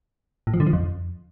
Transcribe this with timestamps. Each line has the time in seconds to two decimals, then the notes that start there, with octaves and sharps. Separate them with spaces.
0.47 A2
0.54 F3
0.60 D3
0.67 F3
0.73 F2